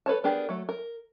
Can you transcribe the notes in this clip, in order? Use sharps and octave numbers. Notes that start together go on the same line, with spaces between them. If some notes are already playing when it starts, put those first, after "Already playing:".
A4 B4 C#5 A5
B3 D4 G4 G#4 A#4
F#3 A3
A#4